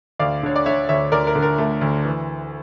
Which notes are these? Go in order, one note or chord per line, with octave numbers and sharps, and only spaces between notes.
D2 D5 F5
D3 C#5
D5
D3 C#5 E5
D2 C#5 E5
D2 A#4 D5
A#4
D3
A#4
A3
D2
E3